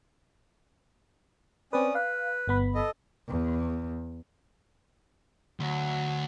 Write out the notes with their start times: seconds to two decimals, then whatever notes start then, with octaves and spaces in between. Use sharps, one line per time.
1.73 C4 C#4 B4 D5 D#6
1.95 B4 F5
2.48 G1 B3 B5
2.75 A4 D#5
3.28 E2
5.60 D2 F#3